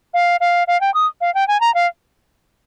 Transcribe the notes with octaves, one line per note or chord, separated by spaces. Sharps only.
F5
F5
F5
G5
D#6
F5
G5
G#5
A#5
F5